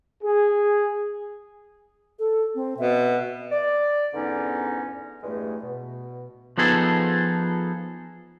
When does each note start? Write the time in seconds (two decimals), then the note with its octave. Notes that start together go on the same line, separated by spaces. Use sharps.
0.23 G#4
2.19 A4
2.55 C4
2.78 B2 E5
3.51 D5
4.14 E2 G#2 D3 B3 C#4 D#4
5.23 E2 G2 G#3 A3
5.63 B2
6.58 F3 B3 D#4 G#4 A4